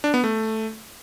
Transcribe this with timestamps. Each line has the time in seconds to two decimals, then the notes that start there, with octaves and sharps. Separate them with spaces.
0.04 D4
0.14 B3
0.24 A3